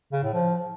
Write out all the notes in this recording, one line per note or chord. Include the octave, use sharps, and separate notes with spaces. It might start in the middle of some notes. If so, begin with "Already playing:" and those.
C#3
A2
F3